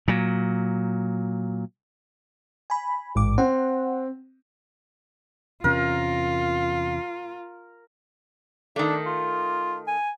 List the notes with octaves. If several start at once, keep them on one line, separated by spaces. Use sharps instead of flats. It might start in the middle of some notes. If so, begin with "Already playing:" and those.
A#2 F#3
G#5 B5
A1 G#2 D6
C4 F#5
E2 C3 C#4 F4 A#4
D#3 A3 D4
F4
G#5